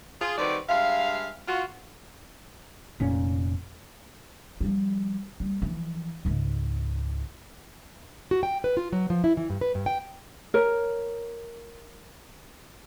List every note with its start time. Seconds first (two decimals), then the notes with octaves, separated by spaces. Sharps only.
0.21 F4 G#4
0.38 D#3 G3 C4 F#4 B4 D5
0.69 G2 G#3 E5 F5
1.48 F4 F#4
3.00 F1 A#2 C#4
4.61 F3 G3
5.40 G3
5.62 E3 F3
6.25 C#2 G#2
8.31 F#4
8.43 G5
8.64 B4
8.77 F4
8.92 F#3
9.10 F3
9.24 E4
9.37 E3
9.50 G2
9.61 B4
9.75 G2
9.86 G5
10.54 A#4 C#5